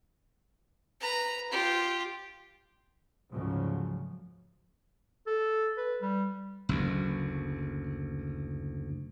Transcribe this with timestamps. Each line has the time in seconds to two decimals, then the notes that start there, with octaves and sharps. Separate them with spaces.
1.00 B4 A#5
1.51 F4 G4
3.30 D2 G#2 C#3 F3 F#3
5.27 A4
5.78 B4
6.01 G3
6.69 F#1 D2